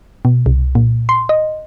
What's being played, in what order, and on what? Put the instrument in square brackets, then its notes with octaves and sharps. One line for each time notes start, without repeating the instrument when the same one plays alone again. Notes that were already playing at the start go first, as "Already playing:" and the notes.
[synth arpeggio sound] B2
C2
A#2
C6
D#5